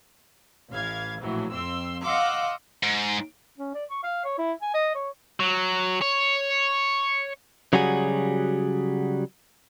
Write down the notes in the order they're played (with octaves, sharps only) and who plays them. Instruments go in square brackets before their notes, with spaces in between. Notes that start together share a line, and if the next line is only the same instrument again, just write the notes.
[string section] A1 E3 F5 G#6
A#1 A2 E3 F#3
F2 C4 C6 E6
D#5 F5 F#5 C6 D6 E6
[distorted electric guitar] G#2
[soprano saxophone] C#4
D5
C#6
F5
C#5
E4
G#5
D#5
C#5
[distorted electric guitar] F#3
C#5
[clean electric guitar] C#3 F#3 G3 F#4 G#4